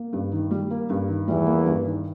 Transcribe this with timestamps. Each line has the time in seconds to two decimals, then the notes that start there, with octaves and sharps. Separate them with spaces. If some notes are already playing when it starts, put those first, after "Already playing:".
Already playing: A#3
0.13 G2
0.32 D#3
0.51 G3
0.70 A#3
0.90 G2
1.08 D#3
1.27 E2 E3 G3
1.46 A#3
1.66 G2
1.85 D#3